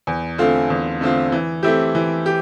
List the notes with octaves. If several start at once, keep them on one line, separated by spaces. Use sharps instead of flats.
E2
D3 A3 C4 F4
E2
D3 A3 C4 F4
E3
A3 C4 E4 G4
E3
G4